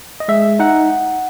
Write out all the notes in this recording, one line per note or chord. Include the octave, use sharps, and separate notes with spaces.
D#5
G#3 E5
D#4 F#5